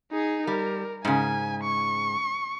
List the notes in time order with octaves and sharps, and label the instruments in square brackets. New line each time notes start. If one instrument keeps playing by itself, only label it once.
[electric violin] D#4 G#4
[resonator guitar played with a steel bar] G3 [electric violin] A#4
[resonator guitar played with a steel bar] G#2 C#3 [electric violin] G#5
[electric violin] C#6